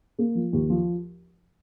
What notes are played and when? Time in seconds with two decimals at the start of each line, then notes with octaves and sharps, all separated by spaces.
0.19 A#3
0.35 F3
0.53 D#2
0.70 F3